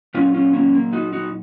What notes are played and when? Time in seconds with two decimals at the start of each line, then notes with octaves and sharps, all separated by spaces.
0.14 A#2 F#3 C#4 F4
0.34 C#4 F4
0.53 A#3 C#4
0.74 A#3
0.93 D#4 F#4
1.13 D#4 F#4